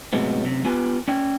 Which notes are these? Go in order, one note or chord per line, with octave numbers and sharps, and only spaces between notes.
A2 C3 F#3 G#3 B3
F#2 C3
B3 F4 G4 B4 G#5
C#4 D5 G5